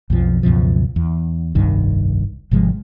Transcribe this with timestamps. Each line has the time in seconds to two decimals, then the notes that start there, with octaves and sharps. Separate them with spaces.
0.10 B1 F2 F3
0.43 C#2 F#2 B2 F3
0.96 E2
1.55 F1 C2 G2 D#3
2.51 G#1 C3 F3 G#3